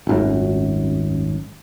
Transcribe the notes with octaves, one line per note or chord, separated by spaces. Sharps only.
D#1 G#1 F#2